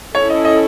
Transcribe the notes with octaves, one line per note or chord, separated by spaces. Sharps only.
C#4 E4 A4 C#5
D#5
D#5